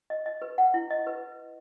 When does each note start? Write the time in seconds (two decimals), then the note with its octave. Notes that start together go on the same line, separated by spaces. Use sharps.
0.10 D#5
0.26 D#5
0.42 B4
0.58 F#5
0.74 E4
0.91 D#5
1.07 B4